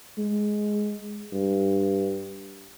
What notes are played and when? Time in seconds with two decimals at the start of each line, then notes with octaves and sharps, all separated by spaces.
0.18 G#3
1.33 G2